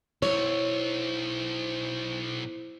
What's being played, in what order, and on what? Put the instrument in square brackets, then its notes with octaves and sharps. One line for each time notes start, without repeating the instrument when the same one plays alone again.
[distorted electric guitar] B1 [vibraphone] E4 [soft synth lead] C5 [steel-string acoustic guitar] C#5